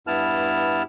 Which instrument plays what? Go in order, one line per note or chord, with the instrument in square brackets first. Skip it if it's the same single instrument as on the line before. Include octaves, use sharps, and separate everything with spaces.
[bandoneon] G2 B3 E4 A5 F6